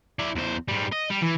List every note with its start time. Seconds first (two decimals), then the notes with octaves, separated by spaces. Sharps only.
0.19 E4 D5
0.35 E2 C5
0.68 G#2 G3
0.92 D#5
1.10 G3
1.22 E3